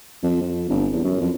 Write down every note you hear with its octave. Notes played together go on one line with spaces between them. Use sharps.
F2
F2
G1
E2
F#2
F2